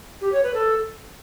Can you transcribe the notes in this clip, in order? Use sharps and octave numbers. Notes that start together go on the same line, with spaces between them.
G4
C#5
B4
A4